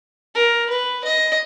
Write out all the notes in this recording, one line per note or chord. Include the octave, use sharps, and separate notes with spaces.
A#4
B4
D#5